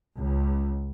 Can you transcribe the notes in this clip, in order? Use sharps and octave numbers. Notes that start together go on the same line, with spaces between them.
C#2